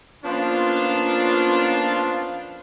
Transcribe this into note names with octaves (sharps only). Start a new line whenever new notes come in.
F3 A#3 B3 C#4 D4 F4